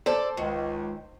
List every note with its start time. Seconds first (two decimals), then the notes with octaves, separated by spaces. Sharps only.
0.06 A4 C5 D5 A5
0.37 C#2 D#3